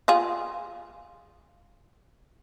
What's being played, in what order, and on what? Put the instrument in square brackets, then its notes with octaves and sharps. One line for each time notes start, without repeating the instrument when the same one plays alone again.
[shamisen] F4 G#4